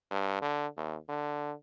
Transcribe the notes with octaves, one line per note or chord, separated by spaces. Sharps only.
G2
D3
D#2
D3